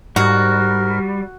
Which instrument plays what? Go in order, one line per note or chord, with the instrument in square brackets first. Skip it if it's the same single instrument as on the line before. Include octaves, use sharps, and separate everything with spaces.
[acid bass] G#2 [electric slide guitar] G3 [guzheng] F#4 [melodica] A#4